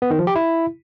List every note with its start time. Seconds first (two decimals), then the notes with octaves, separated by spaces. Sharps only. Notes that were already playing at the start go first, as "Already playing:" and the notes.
0.02 B3
0.10 D#3
0.19 F3
0.27 G4
0.36 E4